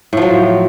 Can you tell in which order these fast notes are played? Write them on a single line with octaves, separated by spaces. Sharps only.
A2 F3 F#3